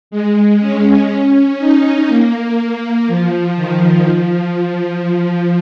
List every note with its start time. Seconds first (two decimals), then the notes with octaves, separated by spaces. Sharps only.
0.11 G#3
0.60 C#4
1.59 D#4
2.08 A#3
3.08 F3
3.56 D#3
4.06 F3